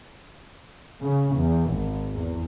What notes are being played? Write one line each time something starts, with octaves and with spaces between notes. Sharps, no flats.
C#3
E2
G#1
E2